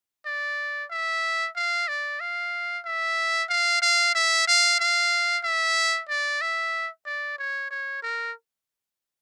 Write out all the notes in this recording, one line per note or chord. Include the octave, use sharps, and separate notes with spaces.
D5
E5
F5
D5
F5
E5
F5
F5
E5
F5
F5
E5
D5
E5
D5
C#5
C#5
A#4